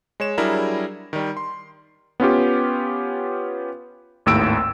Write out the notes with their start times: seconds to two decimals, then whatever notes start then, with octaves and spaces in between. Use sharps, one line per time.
0.20 G#3 C#5 E7
0.38 F#3 G3 D4 E4 G#4 A#4
1.13 D#3 G3
1.37 C6
2.20 B3 C#4 F4 G4
4.26 G#1 D#2 A2 E6 D7